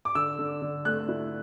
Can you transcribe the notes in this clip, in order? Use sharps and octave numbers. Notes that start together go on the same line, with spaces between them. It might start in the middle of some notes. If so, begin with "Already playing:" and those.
D6
D3 E6
D3
D3
A3 F#6
E4